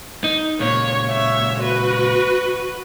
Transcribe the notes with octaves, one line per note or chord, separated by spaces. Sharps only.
D#4
C#2 A#2 C#5
C#5 E5
F#4 B4